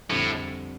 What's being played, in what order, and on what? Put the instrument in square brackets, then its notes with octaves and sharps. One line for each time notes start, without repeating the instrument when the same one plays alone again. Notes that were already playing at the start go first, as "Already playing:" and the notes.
[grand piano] F2 D3 G3 C4 [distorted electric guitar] A2